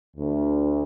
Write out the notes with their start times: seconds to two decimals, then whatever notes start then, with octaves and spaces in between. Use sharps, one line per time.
0.17 D2